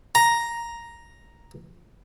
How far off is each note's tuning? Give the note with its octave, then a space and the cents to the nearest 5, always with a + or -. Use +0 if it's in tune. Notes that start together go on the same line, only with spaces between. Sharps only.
A#5 +5